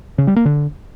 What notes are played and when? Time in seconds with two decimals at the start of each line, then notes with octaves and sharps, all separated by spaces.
0.18 C#3
0.27 G3
0.36 A#3
0.45 D3